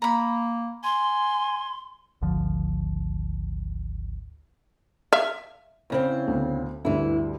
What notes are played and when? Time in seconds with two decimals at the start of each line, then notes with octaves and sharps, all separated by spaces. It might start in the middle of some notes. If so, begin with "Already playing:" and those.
0.02 A#3 A#5 B5
0.84 G#5 C6
2.22 G#1 D2 D3 F3
5.13 E5 F5
5.90 E2 C#3 C4
6.27 D2 B3
6.85 D2 G2 E3 E4